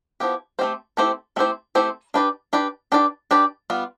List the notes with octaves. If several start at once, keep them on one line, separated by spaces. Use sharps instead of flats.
F3 B3 E4 G4
A3 C4 E4 G4 C5
A3 C4 E4 G4 C5
A3 C4 E4 G4 C5
A3 C4 E4 G4 C5
D4 G4 B4 D5
D4 G4 B4 D5
D4 G4 B4 D5
D4 G4 B4 D5
G3 B3 F4